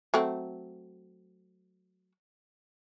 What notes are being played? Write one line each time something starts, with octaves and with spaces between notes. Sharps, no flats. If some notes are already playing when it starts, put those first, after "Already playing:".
F#3 A3 C4